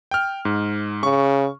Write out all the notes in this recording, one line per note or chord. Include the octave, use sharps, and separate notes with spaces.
G5 F6
G#2
C#3 C#6